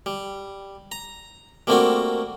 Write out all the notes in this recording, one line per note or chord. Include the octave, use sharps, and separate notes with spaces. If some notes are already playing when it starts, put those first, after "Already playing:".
G3
A#5
G3 A3 A#3 C4 D4 F#4